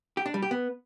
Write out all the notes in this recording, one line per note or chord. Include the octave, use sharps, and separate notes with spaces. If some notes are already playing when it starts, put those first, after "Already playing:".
G4
D4
G3
G4
B3